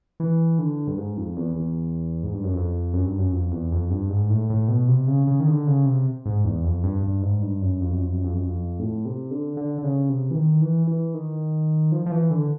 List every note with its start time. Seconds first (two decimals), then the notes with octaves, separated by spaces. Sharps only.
0.20 E3
0.59 D3
0.87 G2
0.97 G#2
1.17 F2
1.37 E2
1.56 E2
2.23 G#2
2.34 G2
2.43 F#2
2.54 F2
2.93 F#2
3.06 G2
3.18 F#2
3.32 F2
3.51 E2
3.71 F2
3.90 G2
4.10 G#2
4.30 A2
4.50 A2
4.68 B2
4.88 C3
5.07 C#3
5.27 C#3
5.40 D#3
5.47 D3
5.67 C#3
5.86 C3
6.26 G#2
6.45 E2
6.64 F2
6.84 G2
7.03 G2
7.22 G#2
7.42 G2
7.61 F#2
7.81 F2
7.92 F#2
8.02 F2
8.13 F#2
8.24 F2
8.34 F#2
8.45 F2
8.79 A2
9.05 C3
9.31 D3
9.57 D3
9.78 D3
9.84 C#3
10.09 C3
10.31 E3
10.35 D#3
10.61 E3
10.87 E3
11.14 D#3
11.92 F3
12.06 F3
12.12 E3
12.31 D3